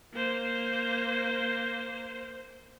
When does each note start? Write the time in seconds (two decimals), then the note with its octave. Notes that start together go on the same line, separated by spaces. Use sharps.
0.14 A#3 C5